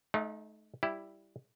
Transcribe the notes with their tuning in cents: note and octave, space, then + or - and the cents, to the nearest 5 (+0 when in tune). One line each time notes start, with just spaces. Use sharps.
A3 -35 D#4 +0 F5 +25
G3 +0 E4 +0 G4 +0